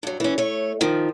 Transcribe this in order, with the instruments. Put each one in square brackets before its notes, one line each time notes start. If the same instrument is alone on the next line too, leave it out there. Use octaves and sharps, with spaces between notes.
[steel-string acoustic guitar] G2 F#3
E3 C#4
A3 C#5
D#3 F3